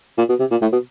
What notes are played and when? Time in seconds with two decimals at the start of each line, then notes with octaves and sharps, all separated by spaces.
0.18 A#2
0.29 B2
0.40 C3
0.51 A#2
0.62 A2
0.72 B2